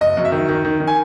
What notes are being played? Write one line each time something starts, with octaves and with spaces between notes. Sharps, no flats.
F#1 D#5
F#2
E5
D#3
D#3
D#3
D#3
G#5